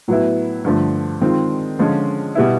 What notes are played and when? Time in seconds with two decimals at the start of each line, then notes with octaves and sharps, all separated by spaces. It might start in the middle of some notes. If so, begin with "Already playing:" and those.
0.08 A2 F#3 B3 E4
0.65 G2 D3 F3 A3
1.21 D#3 G#3 C4 F4
1.79 D3 F3 G#3 C#4 F4
2.35 B2 G3 B3 E4